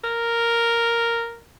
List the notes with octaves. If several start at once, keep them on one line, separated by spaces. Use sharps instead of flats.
A#4